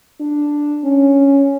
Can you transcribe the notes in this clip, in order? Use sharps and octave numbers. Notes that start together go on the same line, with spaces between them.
D4
C#4